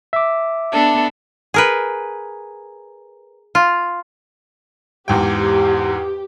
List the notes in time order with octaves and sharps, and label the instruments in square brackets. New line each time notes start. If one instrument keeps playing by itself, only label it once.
[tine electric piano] E5 D6
[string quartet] B3 D4 A4
[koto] G#4 A#4 B4
F4
[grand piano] E2 G#2 G5 [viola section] G4